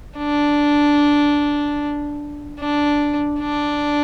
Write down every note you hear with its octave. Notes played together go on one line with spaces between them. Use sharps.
D4
D4
D4